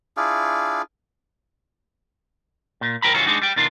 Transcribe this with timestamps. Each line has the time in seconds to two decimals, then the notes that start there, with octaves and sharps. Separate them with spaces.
0.17 D4 E4 F4 G#4
2.81 A#2
3.02 G#2 F3 A#4 G5 A#5 B5
3.14 G2 C#3 E3 C#4 F4 F#4
3.26 G#3 D4 D#4 F#4
3.42 G3 G5
3.56 B2 D#3 D4 F4